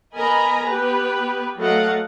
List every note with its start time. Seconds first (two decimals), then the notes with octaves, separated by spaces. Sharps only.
0.15 B3 A#4 D#5 G#5 A#5 B5
0.65 B3 G4 B4
1.57 F#3 A3 D#5 F5 F#5